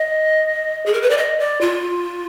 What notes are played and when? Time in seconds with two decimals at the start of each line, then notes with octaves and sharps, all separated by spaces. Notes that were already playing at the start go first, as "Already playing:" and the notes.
Already playing: D#5
0.86 G#4
0.93 A#4
1.02 B4
1.10 D5
1.17 D#5
1.39 D5
1.61 F4